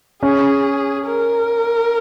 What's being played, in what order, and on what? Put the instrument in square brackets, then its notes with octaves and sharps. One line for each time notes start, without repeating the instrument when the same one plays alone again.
[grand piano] C#4 [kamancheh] G#4
[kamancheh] A#4